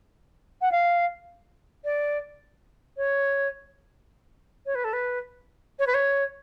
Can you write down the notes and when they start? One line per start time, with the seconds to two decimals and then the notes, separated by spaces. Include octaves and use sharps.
0.62 F#5
0.71 F5
1.84 D5
2.97 C#5
4.66 C#5
4.75 B4
4.84 A4
4.93 B4
5.79 C#5
5.87 B4
5.94 C#5